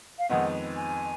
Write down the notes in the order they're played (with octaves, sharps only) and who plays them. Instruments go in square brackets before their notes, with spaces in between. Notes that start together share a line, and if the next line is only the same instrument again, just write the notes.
[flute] F5
[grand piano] F2 D#3 G#3 B3 D#4 [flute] F#5
[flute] G#5